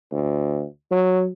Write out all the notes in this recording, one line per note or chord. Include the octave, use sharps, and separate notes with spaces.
D2
F#3